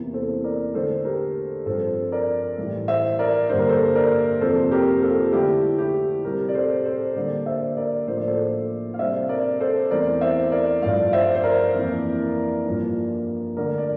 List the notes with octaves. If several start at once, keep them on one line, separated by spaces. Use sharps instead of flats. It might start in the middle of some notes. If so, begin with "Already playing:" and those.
Already playing: E2 C3 E3 A#3
A4 C5
A#4 D5
D3 A3 D4 A4 C5
G4 A#4
G2 F3 C4 A4 C5
A#4 D5
A2 E3 G3
C5 E5
A#4 D5
G2 D3 G3 A#3 D4 C5
A#4
A4 C5
A#4 D5
F2 C3 F3 A#3 A4 C5
G4 A#4
F4 A4
D3 A3 D4 E4 G4
E4 G4
C3 G3 C4 G4 A#4
D5
A4 C5
A4 C5
D3 G3 A#3 D4 A#4 D5
C5 E5
A#4 D5
A2 F3 A#3 D4 C5
D5
A4 C5
F5
C3 G3 D4 C5 E5
A#4 D5
A4 C5
E2 E3 A3 C4 A#4 D5
C5 E5
A#4 D5
G2 F3 A3 D5 F5
C5 E5
C5
A#4 D5
F2 E3 A#3 D4
G2 F3 A#3 D4
D3 A3 D4 A#4 D5
D5